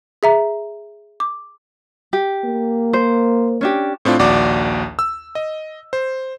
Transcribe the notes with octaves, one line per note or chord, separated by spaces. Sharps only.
G#4 E5 A#5
D6
G4
A#3
C5
C#4 D4 G4
A2 C4 D4 F4
A#1 D#2 F#4 D5 D6
E6
D#5
C5